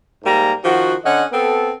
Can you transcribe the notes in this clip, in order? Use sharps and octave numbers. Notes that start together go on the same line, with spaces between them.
G#2 G3 A#3 A#5
D#3 F3 F#4
D3 C#4 D#5 F#5
B3 C4 A4